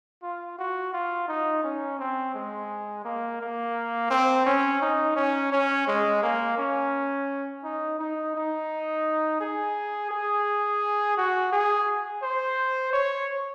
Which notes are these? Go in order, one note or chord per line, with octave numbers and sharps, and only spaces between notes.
F4
F#4
F4
D#4
C#4
C4
G#3
A#3
A#3
C4
C#4
D#4
C#4
C#4
G#3
A#3
C#4
D#4
D#4
D#4
G#4
G#4
F#4
G#4
C5
C#5